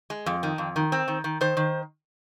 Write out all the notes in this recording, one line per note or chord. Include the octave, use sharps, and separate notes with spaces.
G#3
F2
D#3
F2
D#3
C4
D#3
D#3
D#3 C5
D#3